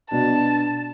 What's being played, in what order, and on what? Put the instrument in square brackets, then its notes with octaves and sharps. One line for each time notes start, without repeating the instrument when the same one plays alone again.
[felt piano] B2 D4 [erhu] A5